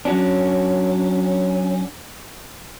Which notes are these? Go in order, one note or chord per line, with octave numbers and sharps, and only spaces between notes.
F#3 C#4 D4